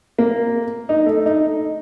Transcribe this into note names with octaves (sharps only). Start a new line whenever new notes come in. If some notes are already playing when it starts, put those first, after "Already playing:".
A#3
D#4
A3
D#4